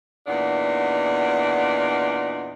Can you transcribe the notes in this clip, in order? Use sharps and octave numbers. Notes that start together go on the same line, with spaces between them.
E2 A#2 D4 D#4 F#5